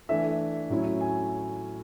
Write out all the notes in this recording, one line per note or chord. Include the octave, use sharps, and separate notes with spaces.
E3 A3 D4 E5
A2 F#3 C#4 E4
G#5